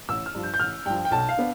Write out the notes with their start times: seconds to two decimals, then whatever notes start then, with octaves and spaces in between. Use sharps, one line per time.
0.09 A1 E6
0.26 F6
0.35 G2 F3
0.43 G6
0.54 G6
0.60 A1 F6
0.86 G2 F3 G5
1.05 G5
1.11 B1 A5
1.29 F5
1.37 B3 D4